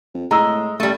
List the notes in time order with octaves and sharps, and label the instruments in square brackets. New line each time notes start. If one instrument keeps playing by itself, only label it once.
[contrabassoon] F2
[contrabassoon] A2 [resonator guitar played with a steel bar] G#3 [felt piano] A#5 E6
[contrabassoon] A1 [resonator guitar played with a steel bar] G3 A3